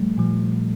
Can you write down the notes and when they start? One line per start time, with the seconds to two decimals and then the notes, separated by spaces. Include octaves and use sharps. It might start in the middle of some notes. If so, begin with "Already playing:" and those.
Already playing: A#2 F3 G3 A3
0.18 A#2 F3